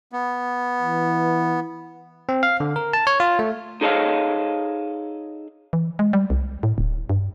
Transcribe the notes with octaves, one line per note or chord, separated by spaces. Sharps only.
B3
E3
C4
F5
D3
A#4
A5
C#5
F4
A3
D#4 G#4 A4 C#5 D#5 F5
E3
G#3
G3
C2
A2
D1
G2